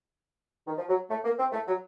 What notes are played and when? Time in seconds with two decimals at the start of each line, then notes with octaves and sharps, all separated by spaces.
0.67 D#3
0.78 F3
0.89 F#3
1.09 A3
1.24 A#3
1.38 C4
1.52 A3
1.67 F#3